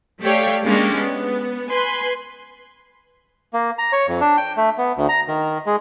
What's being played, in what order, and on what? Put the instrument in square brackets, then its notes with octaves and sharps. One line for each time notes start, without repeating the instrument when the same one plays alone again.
[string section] A3 G4 C#5 D5 F5 G5
G#3 A#3 C#4 D4 G4
B3
B4 G#5 C6
[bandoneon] A#3
A#5
C#5
F2
D4
G5
A3
B3
D2
A#5
D#3
G#3